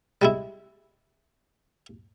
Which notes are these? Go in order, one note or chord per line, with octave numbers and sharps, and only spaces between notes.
G3 G#3 E4